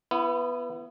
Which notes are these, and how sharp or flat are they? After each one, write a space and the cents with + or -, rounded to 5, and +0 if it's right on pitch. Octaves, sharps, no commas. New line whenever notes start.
B3 +0 E4 +35